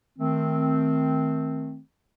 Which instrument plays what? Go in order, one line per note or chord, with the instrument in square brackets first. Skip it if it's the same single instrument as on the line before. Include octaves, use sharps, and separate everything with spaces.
[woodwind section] D#3 A3 C4